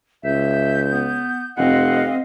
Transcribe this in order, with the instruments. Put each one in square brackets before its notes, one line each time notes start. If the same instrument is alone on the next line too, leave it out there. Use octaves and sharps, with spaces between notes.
[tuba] C#2 [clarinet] E5 [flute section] G6
[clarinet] B3
[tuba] F1 [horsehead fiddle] C4 [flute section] D#5 F5 [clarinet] F#5